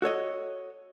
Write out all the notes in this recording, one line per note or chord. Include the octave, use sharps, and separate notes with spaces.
F#4 A4 C#5 D#5